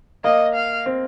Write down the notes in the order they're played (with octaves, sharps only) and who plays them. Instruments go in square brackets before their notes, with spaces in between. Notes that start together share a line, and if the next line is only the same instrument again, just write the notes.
[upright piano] A#3 [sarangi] D#5
[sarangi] F5
[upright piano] C4